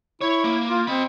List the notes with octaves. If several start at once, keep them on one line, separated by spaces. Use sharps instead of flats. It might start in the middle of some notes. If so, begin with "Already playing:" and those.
E4 C#5
A#3
F4
C4 D#5 B5